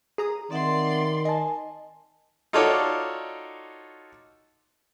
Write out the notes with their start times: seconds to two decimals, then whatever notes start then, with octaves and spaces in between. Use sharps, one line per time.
0.18 G#4 A#5 D#6
0.51 D#3 C4 D5 E5 F#5 C6
1.25 D#5 G#5 A5
2.53 D#4 F4 F#4 A4 C#5 D5